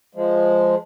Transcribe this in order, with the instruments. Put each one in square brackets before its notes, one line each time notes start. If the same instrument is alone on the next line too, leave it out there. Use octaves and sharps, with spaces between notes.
[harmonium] F3 G#3